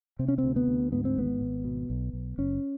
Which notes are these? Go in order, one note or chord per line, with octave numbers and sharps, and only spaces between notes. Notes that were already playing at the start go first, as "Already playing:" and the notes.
C3 C4
C#4
C4
D2
B3
D2
G#2 B3
C4
G#1 B3
G#1
B2
B1
B1
F#1 C#4